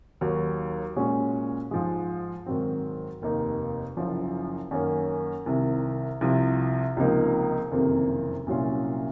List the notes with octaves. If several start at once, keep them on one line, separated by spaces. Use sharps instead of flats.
D#2 D#3 F#3
A#2 G#3 C#4 F#4
G#2 F3 G#3
G#2 D#3 F#3 C4
F1 D#2 D#3 A#3 D#4
F#1 F#2 F3
F#2 D#3 A#3 C#4
C2 C3 D#3
C2 C3 F3
C#2 C3 F3 A#3 D#4
F#1 F2 C3 D#3 A#3
C2 A#2 F#3 C#4 F4